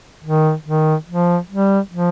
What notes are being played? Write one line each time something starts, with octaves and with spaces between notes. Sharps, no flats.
D#3
D#3
F3
G3
F3